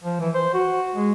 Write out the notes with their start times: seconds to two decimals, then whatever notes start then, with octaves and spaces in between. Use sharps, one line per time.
0.04 F3
0.21 E3
0.35 C5
0.54 F#4
0.95 G#3